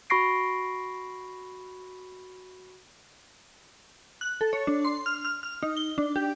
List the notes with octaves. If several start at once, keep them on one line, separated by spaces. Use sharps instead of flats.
F#4 B5 C#6 A#6 C7 D7
F#6
A4
C#5
D4
C6
F6
F6
F6
D#4
G7
D4
G4